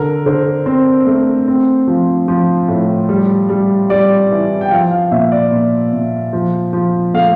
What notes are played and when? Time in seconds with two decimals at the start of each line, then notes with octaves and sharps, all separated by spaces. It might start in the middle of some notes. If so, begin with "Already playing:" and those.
Already playing: D3 A#4
0.26 D3 C5
0.66 C4 C5
1.06 A3
1.48 C4
1.88 F3
2.28 F3
2.68 A2
3.09 G3
3.49 G3
3.90 G3 D5
4.31 E3
4.61 G5
4.71 F3 F5
4.91 F5
5.12 A#2 E5
5.32 D5
5.52 A#2
5.93 A#2
6.33 F3
6.73 F3
7.14 A3 F5